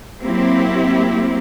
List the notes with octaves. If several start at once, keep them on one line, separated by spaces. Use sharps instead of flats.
F#3 A#3 C4 E4 G4